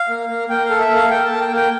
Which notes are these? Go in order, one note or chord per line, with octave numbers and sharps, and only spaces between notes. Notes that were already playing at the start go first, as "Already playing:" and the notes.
Already playing: F5
A#3
A#3
A#3 G5
F5
A4
E5
A#3
F5
A#3 G5
A5
A#3
G5
A#3 G5